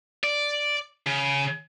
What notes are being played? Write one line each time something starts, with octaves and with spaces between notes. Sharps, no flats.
D5
C#3